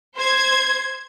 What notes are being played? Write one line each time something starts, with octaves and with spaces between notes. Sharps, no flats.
C5 G#6